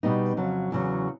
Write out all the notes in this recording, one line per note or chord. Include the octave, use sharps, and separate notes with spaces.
B2 G3 B3 D#4
F2 C#3 F#3
E2 C#3 F#3